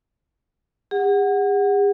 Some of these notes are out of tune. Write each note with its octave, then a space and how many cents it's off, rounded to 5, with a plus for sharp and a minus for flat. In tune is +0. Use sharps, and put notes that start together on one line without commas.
G#4 -45 F#5 +0